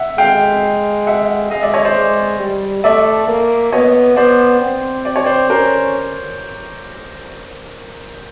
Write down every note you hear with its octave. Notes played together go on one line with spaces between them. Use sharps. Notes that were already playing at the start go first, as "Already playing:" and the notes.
Already playing: E5 F#5
G#3 F5 G5
E5 F#5
G#3 D#5 F5
D5 E5
C#5 D#5
C5 D5
G#3
G3
A3 D5 E5
A#3
B3 C#5 D#5
B3 C5 D5
C4
D5
C#5
C5 D5
C#4 A#4 C5